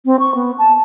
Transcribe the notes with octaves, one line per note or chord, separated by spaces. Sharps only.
C4
C#6
B3
A5